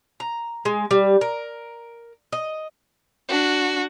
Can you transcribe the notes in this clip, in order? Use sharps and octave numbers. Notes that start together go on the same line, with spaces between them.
A#5
G#3
G3
A#4
D#5
D4 F#4